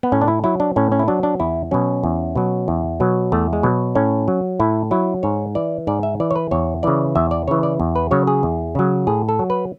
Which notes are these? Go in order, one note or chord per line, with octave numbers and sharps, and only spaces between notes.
B3
A2 C#4
D4
E4
F#3 E4
D4
A2 C#4
C#4
E4
F#3 D4
D4
E2 E4
B2 F#3 C#4
E2
B2 F#3
E2
B2 F#3
E2 A3
G#3
B2 F#3
A2 C#4
F#3
A2 E4
F#3 E4
G#2 C#5
E3 D5
G#2 D5
E5
E3 D5
C#5
B4
E2 C#5
C#3 E3 D5
E2 E5
D5
C#3 E3 C#5
D5
E2
B4
C#3 F#3 C#5
G#4
E2
C#3 F#3
A2 G#4
A4
F#3
B4